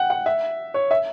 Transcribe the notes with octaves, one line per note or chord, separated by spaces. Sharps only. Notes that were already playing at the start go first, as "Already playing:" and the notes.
Already playing: F#5 G5
F#5
E5
C#5
E5